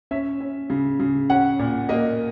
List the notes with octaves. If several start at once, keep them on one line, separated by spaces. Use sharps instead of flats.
C#4 E5
C#4
C#3
C#3
C#4 F#5
A#2
A#3 D#5